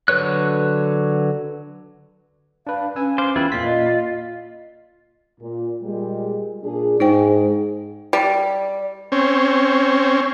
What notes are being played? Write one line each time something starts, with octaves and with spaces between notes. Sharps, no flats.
D3 F#3 B4 C#5 F#6
D4 B4 F5
C#4 B4 G#5 E6
C5 F5 D6
E2 E4 F4 B4 G5 B5
A#2 F4 B6
D#5
A#2
A#2 G3 G#3
A#2 D4 G#4
G#2 D#4 G#4 C5 G5
G3
C4 C#4